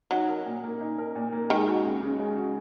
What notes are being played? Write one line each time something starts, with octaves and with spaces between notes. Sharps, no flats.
F#3 D#4
A#4
A#2
A#3
D#4
A#4
A#2
A#3
D#3 G#3
F#4
C#2
C#3
G#3
F#4